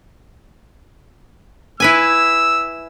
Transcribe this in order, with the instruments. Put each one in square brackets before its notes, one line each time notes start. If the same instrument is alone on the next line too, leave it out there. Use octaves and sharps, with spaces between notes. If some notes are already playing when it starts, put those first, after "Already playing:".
[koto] E4 B4 G#5 [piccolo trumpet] E6